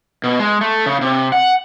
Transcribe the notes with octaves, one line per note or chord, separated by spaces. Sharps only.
B2
G#3
A3
C#3
C3
F#5